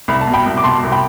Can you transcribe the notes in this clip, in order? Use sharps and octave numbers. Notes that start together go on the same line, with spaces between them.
C2 B5
A5
B2
G5 B5
C2
D6
B2 A5 C6
C2
G5 B5